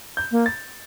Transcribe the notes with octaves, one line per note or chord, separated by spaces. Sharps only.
G6
A#3
A6